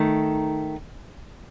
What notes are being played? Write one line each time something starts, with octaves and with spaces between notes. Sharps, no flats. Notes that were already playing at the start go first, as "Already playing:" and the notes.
Already playing: D#3 A3 D#4